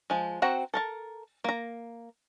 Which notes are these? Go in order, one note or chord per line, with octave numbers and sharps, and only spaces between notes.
F3 G#3
C4 F#4 F#5 A#5
A4 A#4 A5
A#3 A#5